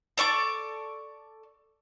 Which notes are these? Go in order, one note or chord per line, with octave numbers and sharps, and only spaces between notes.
A4 D5 C#6 D6